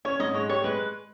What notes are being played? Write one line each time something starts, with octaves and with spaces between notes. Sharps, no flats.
C#4 C#5
G#2 D#5
G#3 C#5
G4 C#5
G#3 B4